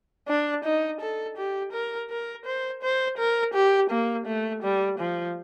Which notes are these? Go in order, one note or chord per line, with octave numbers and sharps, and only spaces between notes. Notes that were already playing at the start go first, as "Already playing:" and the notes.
D4
D#4
A4
G4
A#4
A#4
C5
C5
A#4
G4
A#3
A3
G3
F3